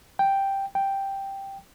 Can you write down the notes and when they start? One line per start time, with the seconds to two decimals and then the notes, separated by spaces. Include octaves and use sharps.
0.19 G5
0.75 G5